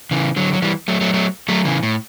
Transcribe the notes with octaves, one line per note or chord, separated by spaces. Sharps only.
C#3 E3
D3 F#3
F#3
E3 G3
F#3 A3
F#3 A3
F#3 A3
F#3 A3
C#3 E3
A2